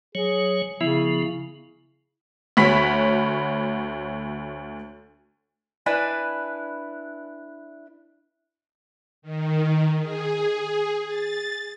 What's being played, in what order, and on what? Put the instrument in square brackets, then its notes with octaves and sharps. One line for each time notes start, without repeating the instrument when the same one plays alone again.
[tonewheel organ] F#3 C#5 [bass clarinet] G#4
[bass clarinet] C#3 [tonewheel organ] F3 B3 [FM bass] E4
[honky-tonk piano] D2 F#4 C#5 B5 B6
[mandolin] D4 E4 B4 G#5
[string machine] D#3
G#4
A6